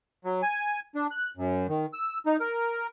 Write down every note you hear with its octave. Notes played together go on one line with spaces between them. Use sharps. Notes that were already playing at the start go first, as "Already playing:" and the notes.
F#3
G#5
D4
F#6
F#2
D#3
E6
D#4
A#4